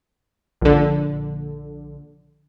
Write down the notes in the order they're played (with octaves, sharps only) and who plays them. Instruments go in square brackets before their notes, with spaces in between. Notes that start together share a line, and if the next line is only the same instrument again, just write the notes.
[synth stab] A#1 D3